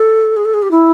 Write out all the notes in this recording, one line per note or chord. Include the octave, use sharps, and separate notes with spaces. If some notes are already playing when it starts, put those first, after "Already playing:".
Already playing: A4
G#4
A4
G#4
G4
E4